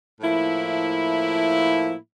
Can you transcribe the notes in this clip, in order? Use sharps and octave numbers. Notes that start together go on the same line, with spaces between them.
A2 F3 A#3 E4